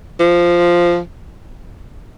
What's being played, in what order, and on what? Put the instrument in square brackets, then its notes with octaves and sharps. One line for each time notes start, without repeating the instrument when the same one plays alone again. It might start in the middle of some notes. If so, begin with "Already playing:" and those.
[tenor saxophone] F3